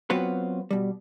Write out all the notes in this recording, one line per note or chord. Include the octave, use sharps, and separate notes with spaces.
F#3 B3 C4 F4 F#4 B4
B2 G3